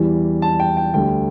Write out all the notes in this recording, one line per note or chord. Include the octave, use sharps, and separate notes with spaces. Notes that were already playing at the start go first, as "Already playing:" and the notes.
Already playing: E2 E3 G3
A5
G5
G5
D2 D3 G3 G5